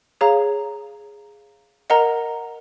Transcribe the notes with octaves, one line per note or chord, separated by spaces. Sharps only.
G#4 C#5 F5 A#5
A#4 D#5 F#5 A#5